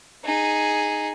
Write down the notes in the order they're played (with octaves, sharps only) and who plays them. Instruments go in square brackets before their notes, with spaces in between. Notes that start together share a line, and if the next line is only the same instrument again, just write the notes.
[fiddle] D#4 G#4